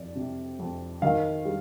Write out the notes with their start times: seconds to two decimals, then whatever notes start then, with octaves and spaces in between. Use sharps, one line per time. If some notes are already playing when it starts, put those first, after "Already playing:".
Already playing: F2 D5
0.15 C3
0.59 F2
1.02 D#3 F5
1.45 G3